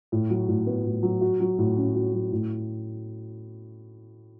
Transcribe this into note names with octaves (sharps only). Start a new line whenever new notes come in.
A2
F#3
A2
B3
A2
F#3
F#4
F#3
A2
C#4
F#4
F#3
A2